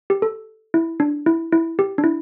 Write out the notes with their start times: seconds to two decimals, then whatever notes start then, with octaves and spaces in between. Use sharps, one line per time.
0.10 G4
0.22 A4
0.74 E4
1.00 D4
1.26 E4
1.52 E4
1.79 G4
1.98 D4
2.04 E4